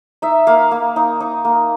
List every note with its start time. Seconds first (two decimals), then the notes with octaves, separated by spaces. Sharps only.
0.22 D#4 E5
0.47 A#3 F5
0.71 A#3
0.96 D#4
1.20 D#4
1.45 A#3